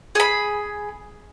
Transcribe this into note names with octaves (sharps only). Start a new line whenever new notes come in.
G#4 B5